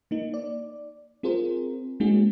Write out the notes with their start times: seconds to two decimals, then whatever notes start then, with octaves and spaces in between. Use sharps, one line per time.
0.11 A#3 D#4
0.34 D5
1.23 C4 F4 G#4 A#4 C5
2.00 G#3 A#3 C#4 D#4 F#4 G#4